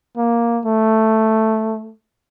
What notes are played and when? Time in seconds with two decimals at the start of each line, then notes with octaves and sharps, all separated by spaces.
0.17 A#3
0.65 A3